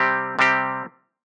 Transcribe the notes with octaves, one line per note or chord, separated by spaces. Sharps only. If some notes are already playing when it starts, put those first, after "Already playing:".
Already playing: C3 G3 C4 G4
C3 G3 C4 G4